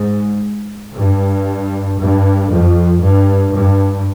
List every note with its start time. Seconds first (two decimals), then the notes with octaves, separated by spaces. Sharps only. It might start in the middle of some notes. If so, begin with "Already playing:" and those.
Already playing: G#2
0.96 G2
1.99 G2
2.50 F2
3.01 G2
3.53 G2